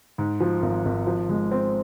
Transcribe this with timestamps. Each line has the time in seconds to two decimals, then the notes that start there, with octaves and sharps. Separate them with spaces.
0.18 G#2
0.40 F3
0.62 G#1
0.85 G#1
1.07 F3
1.29 G#3
1.52 C4